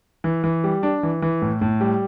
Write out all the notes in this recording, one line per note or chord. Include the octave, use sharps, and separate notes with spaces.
E3
E3
G3
D4
E3
E3
A2
A2
G3